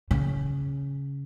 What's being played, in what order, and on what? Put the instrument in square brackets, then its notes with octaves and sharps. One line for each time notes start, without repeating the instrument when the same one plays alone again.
[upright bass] C#3